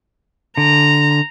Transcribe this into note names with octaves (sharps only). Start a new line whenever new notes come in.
D3 A#5